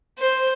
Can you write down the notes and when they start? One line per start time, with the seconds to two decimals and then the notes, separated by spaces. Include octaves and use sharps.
0.18 C5